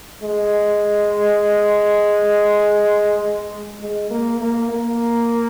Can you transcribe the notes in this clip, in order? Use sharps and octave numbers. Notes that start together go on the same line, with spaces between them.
G#3
G#3
A#3
A#3
A#3